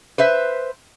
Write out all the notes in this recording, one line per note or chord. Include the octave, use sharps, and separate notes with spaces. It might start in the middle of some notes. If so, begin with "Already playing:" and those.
B4 C5 E5